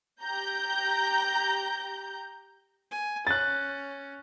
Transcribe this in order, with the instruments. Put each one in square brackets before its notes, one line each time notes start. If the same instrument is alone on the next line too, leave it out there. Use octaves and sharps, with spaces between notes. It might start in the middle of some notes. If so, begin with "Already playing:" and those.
[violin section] G4 A#5 G6
[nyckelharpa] G#5
[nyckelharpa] C#4 [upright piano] F#6 A6